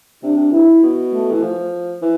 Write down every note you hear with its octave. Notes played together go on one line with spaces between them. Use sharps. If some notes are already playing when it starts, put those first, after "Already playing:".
C3 D4
C3
E3 E4
B2
A3
E3
F3
E3